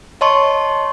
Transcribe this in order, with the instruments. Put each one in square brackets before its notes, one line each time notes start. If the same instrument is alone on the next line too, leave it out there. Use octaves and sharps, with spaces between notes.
[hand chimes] C#5 D#5 A5 C6 C#6